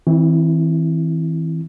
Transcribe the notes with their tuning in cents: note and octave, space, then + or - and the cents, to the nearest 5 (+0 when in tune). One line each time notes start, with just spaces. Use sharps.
E3 -35 C4 +0 E4 +10